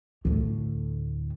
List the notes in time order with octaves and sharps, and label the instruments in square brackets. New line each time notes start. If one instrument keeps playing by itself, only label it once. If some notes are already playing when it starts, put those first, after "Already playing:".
[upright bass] D2 A2